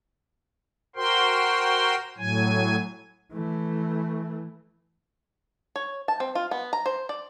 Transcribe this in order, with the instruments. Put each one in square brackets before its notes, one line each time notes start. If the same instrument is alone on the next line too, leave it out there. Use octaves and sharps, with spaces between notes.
[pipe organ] F#4 A#4 C5 G5 C6
A2 F#3 G#5
[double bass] E3 A3
[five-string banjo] C#5
A5
C4
F4
B3
A#5
C5
D5